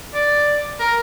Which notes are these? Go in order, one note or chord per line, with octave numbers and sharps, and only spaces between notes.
D5
A#4